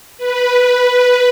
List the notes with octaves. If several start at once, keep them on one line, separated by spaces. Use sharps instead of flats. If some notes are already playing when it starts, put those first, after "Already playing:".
B4